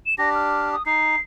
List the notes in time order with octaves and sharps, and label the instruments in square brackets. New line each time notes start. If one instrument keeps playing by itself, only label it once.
[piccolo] E7
[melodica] D4 G4 [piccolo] A#6
[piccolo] F6
D#6
[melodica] D#4 [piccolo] C7